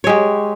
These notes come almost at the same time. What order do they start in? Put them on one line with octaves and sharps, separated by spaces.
C#5 G#3 G4